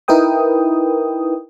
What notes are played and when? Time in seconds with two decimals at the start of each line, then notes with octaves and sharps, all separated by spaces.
0.08 D#4 E4 A#4 B4 G5 D#6